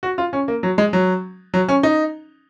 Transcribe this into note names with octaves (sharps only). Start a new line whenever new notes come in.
F#4
F4
C#4
A#3
F#3
G#3
F#3
F#3
C#4
D#4